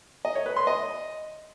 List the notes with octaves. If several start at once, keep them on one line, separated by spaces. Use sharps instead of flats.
D#5
C#5
B4
C6
D#5